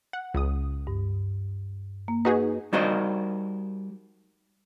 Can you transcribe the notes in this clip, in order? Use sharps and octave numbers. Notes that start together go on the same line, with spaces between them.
F#5
C#2 D#6
G2
A#3
D#4 F#4 G#4 B4
G3 D#4 F#4 A#4 C5 D#5